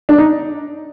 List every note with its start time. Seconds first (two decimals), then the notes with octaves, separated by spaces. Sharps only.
0.09 D4
0.18 D#4